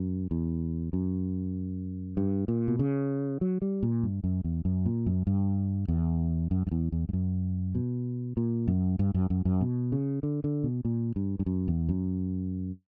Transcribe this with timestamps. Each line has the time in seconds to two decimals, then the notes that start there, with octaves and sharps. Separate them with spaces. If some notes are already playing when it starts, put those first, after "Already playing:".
Already playing: F#2
0.31 E2
0.93 F#2
2.17 G2
2.48 A#2
2.68 B2
2.79 C#3
3.41 F#3
3.62 G3
3.83 A#2
4.03 G2
4.24 F#2
4.44 E2
4.65 F#2
4.86 A#2
5.06 F#2
5.27 G2
5.88 E2
6.51 F#2
6.67 F#2
6.71 E2
6.92 E2
7.09 G2
7.13 F#2
7.75 B2
8.37 A#2
8.68 F#2
8.99 G2
9.14 F#2
9.30 F#2
9.45 F#2
9.61 B2
9.92 C#3
10.23 D3
10.44 D3
10.64 B2
10.85 A#2
11.16 G2
11.39 G2
11.46 F#2
11.68 E2
11.89 F#2